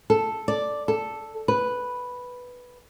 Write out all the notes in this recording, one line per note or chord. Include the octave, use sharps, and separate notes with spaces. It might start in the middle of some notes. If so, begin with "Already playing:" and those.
A4
D5
A4
B4